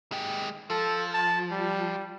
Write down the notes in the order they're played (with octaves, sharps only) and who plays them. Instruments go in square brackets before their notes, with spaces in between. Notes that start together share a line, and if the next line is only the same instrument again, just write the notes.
[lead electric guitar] G#3 G4
[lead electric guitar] F3 [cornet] A4
[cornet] A5
G3